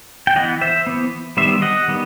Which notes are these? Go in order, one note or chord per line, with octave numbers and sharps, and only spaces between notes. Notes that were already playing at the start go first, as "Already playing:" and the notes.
G5
E3 B3 D#5 F#5
C5 E5
E3 B3
D#3 G3 B3 C5 E5
D#5 F#5
D#3 G3 B3